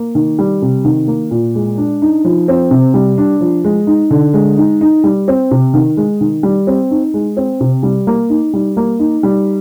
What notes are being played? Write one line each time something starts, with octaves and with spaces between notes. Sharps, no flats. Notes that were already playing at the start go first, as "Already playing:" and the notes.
Already playing: A#3
D#3
G3
C3
D#3
A#3
A#2
G#3
D4
D#4
F3
C4
C3
G3
D4
F3
G#3
D#4
D3
G#3
D#4
D#4
G3
C4
C3
D#3
G#3
D#3
G3
C4
D#4
G#3
C4
C3
G3
A#3
D#4
G3
A#3
D#4
G3